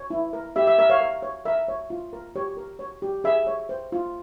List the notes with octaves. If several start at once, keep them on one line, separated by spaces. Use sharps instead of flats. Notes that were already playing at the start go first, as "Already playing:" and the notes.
Already playing: C#5
E4
A#4
G4 E5
E5
A#4 E5
C#5 F5
A#4
C#5
A#4 E5
C#5
F4
A#4
G4 C#5
A#4
C#5
G4
G#4 E5
C#5
C5
F4